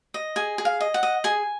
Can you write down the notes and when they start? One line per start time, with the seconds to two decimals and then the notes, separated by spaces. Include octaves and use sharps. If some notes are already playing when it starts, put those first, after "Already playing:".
0.14 D#5
0.36 G#4 G#5
0.58 G#4
0.65 F5
0.80 D#5
0.94 F#5
1.03 D#5
1.24 G#4 G#5